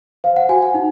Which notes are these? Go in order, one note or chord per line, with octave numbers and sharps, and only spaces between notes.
C5 F5
F#5
F#4 G#5
F#5
D#4